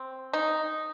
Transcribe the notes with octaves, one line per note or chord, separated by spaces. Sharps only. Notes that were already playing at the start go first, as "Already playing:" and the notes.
Already playing: C4
D#4